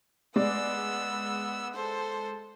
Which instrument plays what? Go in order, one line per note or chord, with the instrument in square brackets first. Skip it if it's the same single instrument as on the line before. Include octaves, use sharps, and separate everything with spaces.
[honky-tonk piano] G#3 D5 [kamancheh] B3 E6
[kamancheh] A4 C5